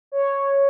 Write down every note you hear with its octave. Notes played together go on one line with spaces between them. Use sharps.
C#5